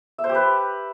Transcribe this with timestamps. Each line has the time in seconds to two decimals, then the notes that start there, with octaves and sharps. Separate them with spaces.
0.18 E5
0.24 C5
0.29 G4
0.35 B4